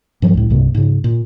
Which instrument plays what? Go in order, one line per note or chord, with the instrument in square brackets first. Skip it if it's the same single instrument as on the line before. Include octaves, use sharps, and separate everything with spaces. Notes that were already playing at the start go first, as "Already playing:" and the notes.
[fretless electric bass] G2 F3 F#3
C#2 A2
C2 G2 C3 A#3
G#2 C#3
A#2